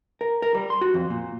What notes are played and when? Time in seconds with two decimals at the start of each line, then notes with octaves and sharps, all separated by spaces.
0.21 A#4
0.42 A#4
0.55 G3
0.70 C6
0.81 F#4
0.94 F2
1.10 A#2